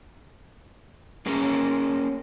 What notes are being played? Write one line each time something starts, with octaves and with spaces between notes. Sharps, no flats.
A#3 C#4 G#4 A#4